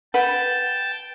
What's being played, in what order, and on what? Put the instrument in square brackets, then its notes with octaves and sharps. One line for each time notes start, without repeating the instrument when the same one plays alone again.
[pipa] B4 F#5 [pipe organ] G5 A5